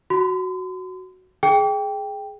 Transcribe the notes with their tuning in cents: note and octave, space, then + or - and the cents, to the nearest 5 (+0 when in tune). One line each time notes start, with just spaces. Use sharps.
F#4 +0 C6 -40
G#4 +15 G5 +5